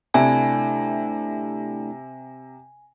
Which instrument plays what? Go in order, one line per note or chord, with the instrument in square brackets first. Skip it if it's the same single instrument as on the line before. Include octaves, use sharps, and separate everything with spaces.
[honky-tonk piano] C3 [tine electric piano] A3 D4 E4 [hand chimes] G#5